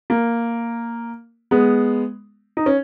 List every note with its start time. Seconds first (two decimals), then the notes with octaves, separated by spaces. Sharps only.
0.10 A#3
1.51 G#3 B3
2.57 D#4
2.66 C#4